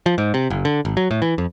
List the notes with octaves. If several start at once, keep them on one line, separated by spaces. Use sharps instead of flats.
F3
G#2
C3
F#1
D3
G#1
F#3
A2
E3
F2